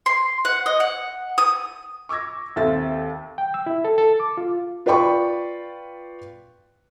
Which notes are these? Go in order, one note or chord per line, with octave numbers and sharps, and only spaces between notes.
C6
F#5
D#5
F#5
D#6
C#6 D6 E6 G#6 A#6
D#2 C4 A4 E5 A6
G5
E6
E4
A4
A4
D6
F4
F4 B4 D5 G5 B5 C#6